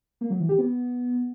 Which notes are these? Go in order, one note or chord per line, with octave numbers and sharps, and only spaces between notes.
A#3
F#3
E3
G4
B3